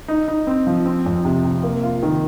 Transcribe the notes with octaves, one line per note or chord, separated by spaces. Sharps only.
D#4
D#4
C4
F3
C4
F2
C3
C3
A#3
F4
D#3